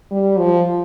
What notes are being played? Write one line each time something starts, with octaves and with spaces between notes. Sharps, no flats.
G3
F3